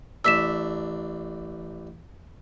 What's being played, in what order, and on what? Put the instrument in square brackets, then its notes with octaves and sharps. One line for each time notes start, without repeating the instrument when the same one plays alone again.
[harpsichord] A1 D4 [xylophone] E6 B6 E7